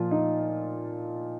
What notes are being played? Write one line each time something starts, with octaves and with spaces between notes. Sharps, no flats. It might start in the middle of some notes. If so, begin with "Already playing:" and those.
Already playing: A#2 F3 F4
D#4